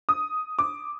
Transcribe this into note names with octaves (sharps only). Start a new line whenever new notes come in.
D#6
D6